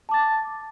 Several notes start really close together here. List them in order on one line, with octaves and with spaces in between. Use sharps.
A5 D6 A6